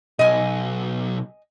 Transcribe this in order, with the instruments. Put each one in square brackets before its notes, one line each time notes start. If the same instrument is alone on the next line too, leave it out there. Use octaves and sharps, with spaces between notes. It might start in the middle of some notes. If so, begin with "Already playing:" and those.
[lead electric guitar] B1 [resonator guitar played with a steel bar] D#5 G#5